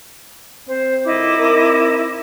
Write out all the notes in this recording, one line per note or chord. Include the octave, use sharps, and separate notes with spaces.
C4 C5
A2 D#3 E4 F4 D#5 D6
C4 D#4 A#4